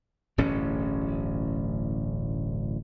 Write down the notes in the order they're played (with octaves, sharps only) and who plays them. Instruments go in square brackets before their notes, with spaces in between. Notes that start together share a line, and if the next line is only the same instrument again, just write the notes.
[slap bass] D1 A1 G2 C#4